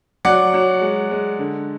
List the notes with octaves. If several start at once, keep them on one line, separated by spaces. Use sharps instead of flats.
F#3 D5 F#5
F#3
G#3
G#3
D3